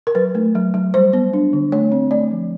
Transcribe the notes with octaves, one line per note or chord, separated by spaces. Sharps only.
A#4
F#3 B4
A3
F#3
F#3
G3 C5
B3
D4
D3
A3 C#5
C4
A3 D5
F3